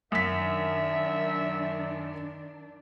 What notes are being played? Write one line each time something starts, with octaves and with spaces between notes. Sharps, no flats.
F#2 D#3 D4 E5 B6